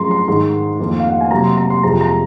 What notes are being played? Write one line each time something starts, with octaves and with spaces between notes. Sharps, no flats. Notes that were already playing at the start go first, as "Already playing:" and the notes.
Already playing: F#2 F3 G#3 A#5 C6
C6
G#2 D#3 G#3 C6
F2 D#3 A#3
F5
F#5
G#5
C3 F#3 A#3 A#5
C6
A#5
C6
F2 C3 F3 G#3 A#5
A#5